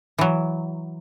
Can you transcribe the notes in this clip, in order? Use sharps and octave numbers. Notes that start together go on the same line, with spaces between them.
E3 F#3